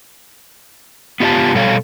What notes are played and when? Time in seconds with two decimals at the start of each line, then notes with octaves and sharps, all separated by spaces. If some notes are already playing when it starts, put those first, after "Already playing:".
1.20 B3 F4 G4 D#5 F5 A5
1.55 B2 G3 A4 C#5 F5